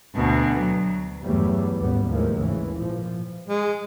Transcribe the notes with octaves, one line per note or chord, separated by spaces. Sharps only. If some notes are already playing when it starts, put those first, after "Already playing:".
D2 B2
F#3
E2 G2 E3 F#3 G3 A3
A1 D#2 G#2 G3 B3
D#2 A2 D#3 F3 G#3 A#3
G#1 C#3 E3
A#2 F3
G#3